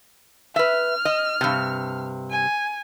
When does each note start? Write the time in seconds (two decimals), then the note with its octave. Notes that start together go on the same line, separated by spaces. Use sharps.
0.56 B4 E5 F6
1.05 D#5
1.41 G2 C3
2.30 G#5